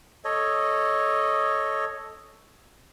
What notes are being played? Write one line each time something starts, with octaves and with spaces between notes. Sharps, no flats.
A4 C#5 D#5